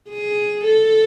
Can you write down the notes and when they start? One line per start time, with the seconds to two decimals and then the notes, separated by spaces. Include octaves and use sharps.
0.10 G#4
0.65 A4